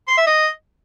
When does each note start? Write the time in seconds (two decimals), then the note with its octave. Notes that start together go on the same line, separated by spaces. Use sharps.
0.08 C6
0.17 E5
0.27 D#5